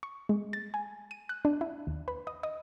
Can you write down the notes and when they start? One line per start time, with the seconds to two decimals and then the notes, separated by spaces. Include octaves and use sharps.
0.03 C#6
0.29 G#3
0.53 A6
0.74 G#5
1.11 D#7
1.29 F#6
1.45 D4
1.61 E4
1.87 D#2
2.08 B4
2.27 D#5
2.43 D#5